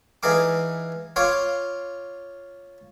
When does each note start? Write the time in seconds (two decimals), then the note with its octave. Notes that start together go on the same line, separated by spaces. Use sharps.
0.23 E3 D#4 G#4 F5 D6
1.16 F4 C#5 F5 D6